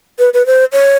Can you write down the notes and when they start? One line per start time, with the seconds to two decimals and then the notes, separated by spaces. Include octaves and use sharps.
0.19 B4
0.34 B4
0.46 C5
0.72 C#5